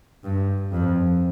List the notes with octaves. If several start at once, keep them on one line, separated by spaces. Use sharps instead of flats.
G2
F2